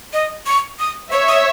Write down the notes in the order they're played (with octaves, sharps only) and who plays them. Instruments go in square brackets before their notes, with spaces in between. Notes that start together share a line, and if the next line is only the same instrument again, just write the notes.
[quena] D#5
C#6
D#6
[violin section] C#5 E5 [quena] C#6
[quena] D#6